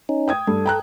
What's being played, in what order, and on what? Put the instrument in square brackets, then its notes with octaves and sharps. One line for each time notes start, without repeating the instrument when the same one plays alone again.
[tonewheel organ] C#4 D#4
[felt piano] G5 D#6 G#6
[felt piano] G2 [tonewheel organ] A4
[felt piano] G5 A#5 F#6